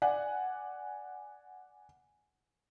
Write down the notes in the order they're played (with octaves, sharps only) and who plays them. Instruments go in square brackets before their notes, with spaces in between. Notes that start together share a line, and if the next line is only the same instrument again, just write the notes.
[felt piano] D5 F#5 G#5